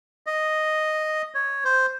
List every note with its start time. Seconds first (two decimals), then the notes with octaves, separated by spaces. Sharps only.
0.26 D#5
1.34 C#5
1.65 C5